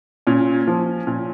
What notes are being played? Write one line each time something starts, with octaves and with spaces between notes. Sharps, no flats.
A#2 C#4
F3
A#2